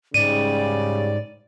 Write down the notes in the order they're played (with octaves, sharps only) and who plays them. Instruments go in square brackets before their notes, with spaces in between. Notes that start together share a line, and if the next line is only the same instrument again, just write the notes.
[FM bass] G#2 [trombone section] C#3 G3 [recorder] D5 [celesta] D#7